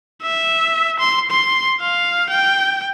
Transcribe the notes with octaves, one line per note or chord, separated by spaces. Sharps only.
E5
C6
C6
F5
G5